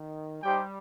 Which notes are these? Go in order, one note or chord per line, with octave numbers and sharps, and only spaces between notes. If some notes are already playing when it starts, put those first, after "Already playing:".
Already playing: D#3
G3 D#4 G4 C5 G5